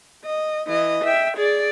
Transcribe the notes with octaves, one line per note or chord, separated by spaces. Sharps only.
D#5
E3 D#5
E5 G5
G#4 D5